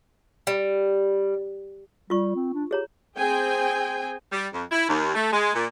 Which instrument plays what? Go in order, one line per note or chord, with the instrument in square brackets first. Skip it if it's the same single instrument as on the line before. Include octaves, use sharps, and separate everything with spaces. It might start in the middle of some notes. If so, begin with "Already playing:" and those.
[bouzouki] G3
[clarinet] G3 [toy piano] F4 C#6
[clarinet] C4
D4
[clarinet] G4 [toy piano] G#4 C#5 A#5
[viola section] C4 G#4 G5 G#5
[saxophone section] G3
F2
E4
D#2
A3
G#3
A#2